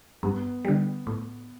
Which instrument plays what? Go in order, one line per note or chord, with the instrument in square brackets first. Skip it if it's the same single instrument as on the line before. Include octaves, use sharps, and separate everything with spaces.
[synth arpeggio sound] G2 [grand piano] B3
[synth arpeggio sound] D3 G3
A2